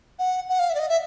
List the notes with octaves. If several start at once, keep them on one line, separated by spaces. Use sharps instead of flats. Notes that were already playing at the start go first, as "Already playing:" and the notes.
F#5
F#5
F5
E5
D5
D#5
E5